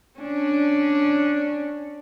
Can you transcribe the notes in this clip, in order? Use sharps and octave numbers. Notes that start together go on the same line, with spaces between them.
C#4 D4